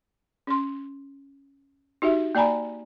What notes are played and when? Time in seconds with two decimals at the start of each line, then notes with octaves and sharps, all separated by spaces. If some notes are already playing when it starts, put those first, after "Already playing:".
0.47 C#4 C6
2.02 D#4 F#4 G4 E5
2.35 A#3 D5 G#5 A#5 B5